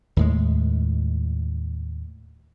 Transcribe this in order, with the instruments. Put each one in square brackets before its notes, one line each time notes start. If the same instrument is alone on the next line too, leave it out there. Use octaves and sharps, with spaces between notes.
[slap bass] D#2 A2 G#3